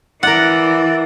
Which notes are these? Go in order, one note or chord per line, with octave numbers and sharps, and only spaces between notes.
E3 A#4 D5 F#5